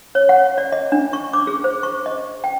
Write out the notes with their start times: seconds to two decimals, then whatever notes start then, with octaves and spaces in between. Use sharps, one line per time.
0.15 C#5
0.29 F#5
0.58 D5
0.72 D#5
0.92 D4
1.13 C#6
1.33 D6
1.47 G#4
1.64 C5
1.83 C#6
2.06 D#5
2.44 G5